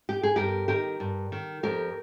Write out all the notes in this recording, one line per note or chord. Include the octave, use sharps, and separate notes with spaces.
G4
G#4
G2 G4 A#4
D#3 G4 A#4
G2
D#3
F2 G4 A#4